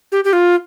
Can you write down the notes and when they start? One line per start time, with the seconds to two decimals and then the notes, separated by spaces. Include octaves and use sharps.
0.12 G4
0.24 G4
0.33 F4